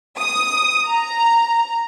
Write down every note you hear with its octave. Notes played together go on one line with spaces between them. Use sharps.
D#6
A#5